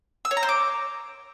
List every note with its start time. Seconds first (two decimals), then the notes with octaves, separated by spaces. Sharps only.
0.25 E6
0.31 C#5
0.37 A#5
0.43 C5
0.49 D6